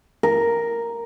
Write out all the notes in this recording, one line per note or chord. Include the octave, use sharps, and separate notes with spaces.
A#4